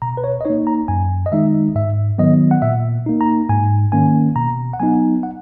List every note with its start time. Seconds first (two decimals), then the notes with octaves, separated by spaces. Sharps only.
0.02 B2 A#5
0.17 B4
0.24 C#5
0.41 D#5
0.45 A#3 D#4 C#5
0.67 A#5
0.88 F#2 G#5
1.26 D#5
1.32 D#3 G#3 D#4 E5
1.75 G#2 E5
2.18 D#3 F#3 B3 D#5
2.51 F#5
2.62 A#2 E5
3.06 A#3 D#4
3.21 A#5
3.49 G#2 G#5
3.92 D#3 A#3 C#4 G#5
4.36 B2 A#5
4.73 F#5
4.80 F#3 B3 D#4 G#5
5.23 F#5